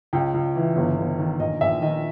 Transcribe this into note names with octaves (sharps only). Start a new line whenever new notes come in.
C#2 G5
C#2
E3
G1
G1
D#3
A#1 D#5
A#1 E5
D#3 D#5